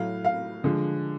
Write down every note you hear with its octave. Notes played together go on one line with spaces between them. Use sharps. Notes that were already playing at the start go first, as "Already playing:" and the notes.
Already playing: A2 F#3 A3 F5
F5
D3 F3 G#3